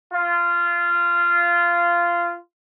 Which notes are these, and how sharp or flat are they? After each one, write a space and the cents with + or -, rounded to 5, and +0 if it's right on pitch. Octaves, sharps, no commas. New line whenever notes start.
F4 -15